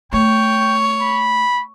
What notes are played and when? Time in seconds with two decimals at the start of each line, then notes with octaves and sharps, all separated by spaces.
0.13 A3 C#5 G5
1.01 B5